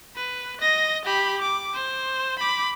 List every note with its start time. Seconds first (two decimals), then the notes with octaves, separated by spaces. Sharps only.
0.16 B4
0.61 D#5 A#6
1.05 G4 B5
1.42 D6
1.74 C5
2.39 B5 D6